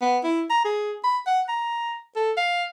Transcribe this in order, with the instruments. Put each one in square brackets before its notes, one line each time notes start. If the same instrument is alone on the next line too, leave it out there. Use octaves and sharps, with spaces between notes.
[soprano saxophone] B3
E4
A#5
G#4
B5
F#5
A#5
A4
F5